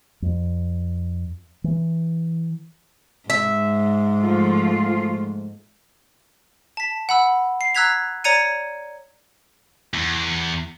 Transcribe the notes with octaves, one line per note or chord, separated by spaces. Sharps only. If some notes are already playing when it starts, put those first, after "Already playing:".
F2
E3
G#2 E5
F3 A3 F4
A5 B6
F#5 B5 E6
C7
A#5 E6 F#6 G#6 B6 F7
C#5 D5 A#5 G#6 C#7 D#7
E2